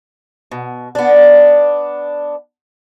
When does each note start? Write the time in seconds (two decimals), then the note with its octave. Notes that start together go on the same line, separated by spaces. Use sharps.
0.52 B2
0.95 B3 D4